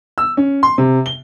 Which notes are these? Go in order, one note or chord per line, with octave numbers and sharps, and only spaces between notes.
E6
C#4
C6
C3
G7